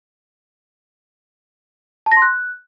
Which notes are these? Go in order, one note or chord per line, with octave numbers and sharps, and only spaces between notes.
A5
A#6
C6
F#6